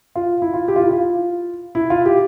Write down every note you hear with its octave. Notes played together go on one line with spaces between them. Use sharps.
F4
E4
F4
G4
F4
E4
F4
E4
F4
G4